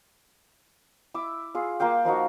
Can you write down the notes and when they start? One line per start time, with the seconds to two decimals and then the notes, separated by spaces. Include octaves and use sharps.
1.14 E4 E5 D6 E6
1.55 F4 G#4
1.80 A#3 F4 F5 G5
2.05 F3 A#3 D#4 F#4